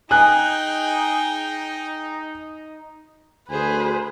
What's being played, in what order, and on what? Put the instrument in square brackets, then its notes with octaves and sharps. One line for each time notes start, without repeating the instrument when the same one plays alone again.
[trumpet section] D#4 [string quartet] G#4 G5 [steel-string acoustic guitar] G#5 [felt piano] F#6
[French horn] D2 [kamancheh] G#4 C5 [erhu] B4